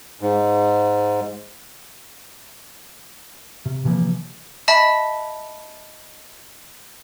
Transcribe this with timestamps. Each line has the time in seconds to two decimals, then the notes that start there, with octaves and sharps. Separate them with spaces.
0.21 G#2
3.66 C3
3.85 C3 E3 F3 A#3
4.68 D#5 E5 A5 B5